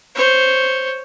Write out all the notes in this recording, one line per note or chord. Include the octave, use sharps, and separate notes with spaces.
C5 C#5